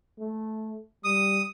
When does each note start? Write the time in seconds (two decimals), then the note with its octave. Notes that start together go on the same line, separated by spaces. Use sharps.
0.19 A3
1.04 G3 D#6